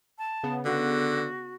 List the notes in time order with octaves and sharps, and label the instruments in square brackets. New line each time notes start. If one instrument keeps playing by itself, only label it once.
[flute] A5
[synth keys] C#3 B3
[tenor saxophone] D3 [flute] F#4